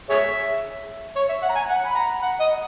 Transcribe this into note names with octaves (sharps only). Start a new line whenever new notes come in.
G#4 C#5 E5
C#5
E5
F#5
A#5
G#5
F#5
B5
A#5
F#5
D#5